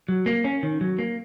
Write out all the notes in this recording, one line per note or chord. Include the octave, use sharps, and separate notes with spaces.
F#3
A#3
C#4
D#3
F#3
A#3